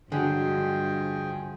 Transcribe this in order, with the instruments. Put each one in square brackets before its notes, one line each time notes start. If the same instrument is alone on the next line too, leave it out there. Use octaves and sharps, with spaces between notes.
[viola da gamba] G2 F3 [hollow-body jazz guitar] D3 [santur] F#3 G#3 [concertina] G#4 G5